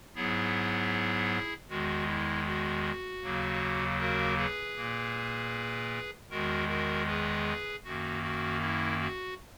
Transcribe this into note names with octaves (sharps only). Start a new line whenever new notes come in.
G#2 F#3 B3 E4 G#4
E2 D#3 G#3 F#4
E4
F#4
D#2 C#3 F#3 A#3
F#4 A#4
G#4 B4
A#2 A#3
E2 D#3 G#3 F#4 A#4
F#4 A#4
G#4 B4
F#2 D#3 A#3 F#4
F#4
E4
F#4